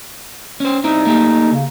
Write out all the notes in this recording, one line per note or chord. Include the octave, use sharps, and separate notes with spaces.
C#4 C5
C4 D#4 E4
A3 A#3 G4
C#3